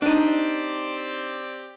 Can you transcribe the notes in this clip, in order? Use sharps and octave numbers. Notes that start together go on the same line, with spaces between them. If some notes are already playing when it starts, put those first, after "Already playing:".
C4 D4 D#4 G4 D5